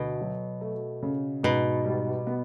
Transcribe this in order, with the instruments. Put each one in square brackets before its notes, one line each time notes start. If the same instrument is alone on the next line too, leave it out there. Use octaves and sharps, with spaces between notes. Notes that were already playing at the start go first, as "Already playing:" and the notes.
Already playing: [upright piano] D2 [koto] B2
[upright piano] F#3
A3
C#3
[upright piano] G#2 [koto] B2
[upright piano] G3
B3